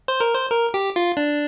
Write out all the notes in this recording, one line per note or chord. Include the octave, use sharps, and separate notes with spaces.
C5
A#4
C5
A#4
G4
F4
D4